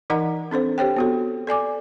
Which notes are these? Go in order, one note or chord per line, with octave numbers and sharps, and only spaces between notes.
E3 D#4 A#4 D#5 F#5 A#5
C4 D4 A4 C5
G4 C5 C#5 G5
B3 F#4 A4
A4 D5 G#5 D6